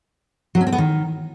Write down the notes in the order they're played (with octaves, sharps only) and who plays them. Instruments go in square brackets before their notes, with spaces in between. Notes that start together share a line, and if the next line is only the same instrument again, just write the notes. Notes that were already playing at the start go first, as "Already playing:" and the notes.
[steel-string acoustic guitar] F#3
C#4
C4
B3
D#3